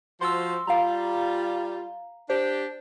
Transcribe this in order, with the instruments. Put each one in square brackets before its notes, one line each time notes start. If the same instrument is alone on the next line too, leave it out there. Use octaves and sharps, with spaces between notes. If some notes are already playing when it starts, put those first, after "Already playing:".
[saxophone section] F3 F#4 C5 [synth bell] C6 E6
[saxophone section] G3 F4 [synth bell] F5 A#5
[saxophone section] D4 G4 [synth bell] C5